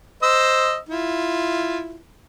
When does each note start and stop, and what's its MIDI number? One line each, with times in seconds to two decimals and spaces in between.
0.23 0.77 72
0.23 0.77 75
0.23 0.77 88
0.89 1.99 64
0.89 1.99 65